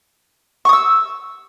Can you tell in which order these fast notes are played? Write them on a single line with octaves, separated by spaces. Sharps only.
C#6 D#6 E6